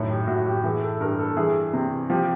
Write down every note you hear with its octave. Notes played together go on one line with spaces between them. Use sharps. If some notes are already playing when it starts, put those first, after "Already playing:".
Already playing: F#2 A2 D#3 C#5
G4
A2 F#4
G4
E3 G#4
A4
G2 A#4
A4
E3 G#4
C3
F3 G4